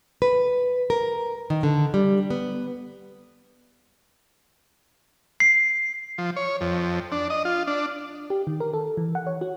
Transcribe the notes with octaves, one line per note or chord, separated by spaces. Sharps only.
B4
A#4
D#3
D3
G3
B3
C7
F3
C#5
F2
D4
D#5
F4
D4
G4
D#3
A#4
A4
E3
F#5
C#5
F#4